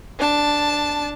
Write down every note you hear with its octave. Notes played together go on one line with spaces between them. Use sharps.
D4 A5